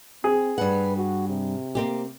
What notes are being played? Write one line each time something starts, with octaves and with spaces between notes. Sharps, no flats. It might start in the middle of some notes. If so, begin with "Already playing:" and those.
C4 G#4
G2 B4 F#5
F#4
C3
A#3 C4 G4